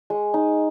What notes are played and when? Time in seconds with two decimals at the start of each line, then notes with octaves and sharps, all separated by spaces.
0.10 G#3
0.34 D#4